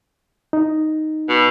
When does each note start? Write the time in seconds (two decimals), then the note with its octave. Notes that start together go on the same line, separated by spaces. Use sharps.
0.53 D#4
1.29 B2